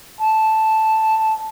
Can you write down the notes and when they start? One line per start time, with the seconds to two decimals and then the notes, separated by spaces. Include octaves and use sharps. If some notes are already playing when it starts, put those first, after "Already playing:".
0.21 A5